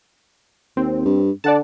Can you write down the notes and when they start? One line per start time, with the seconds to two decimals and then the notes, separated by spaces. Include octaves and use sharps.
0.77 D#2 C4
1.05 G2
1.44 D3 D5 F#5 A5